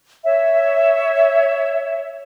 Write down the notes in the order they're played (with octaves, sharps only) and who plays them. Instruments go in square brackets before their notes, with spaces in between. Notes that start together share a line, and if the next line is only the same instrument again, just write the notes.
[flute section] C#5 E5